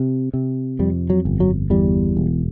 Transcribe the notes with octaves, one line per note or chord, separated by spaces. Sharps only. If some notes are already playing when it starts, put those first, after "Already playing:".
Already playing: C3
C3
F2 G3
F#3
G1
F#3
E2 G3
E1